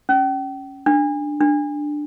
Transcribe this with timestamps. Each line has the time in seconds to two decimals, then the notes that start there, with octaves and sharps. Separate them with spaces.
0.09 C#4
0.86 D4
1.41 D4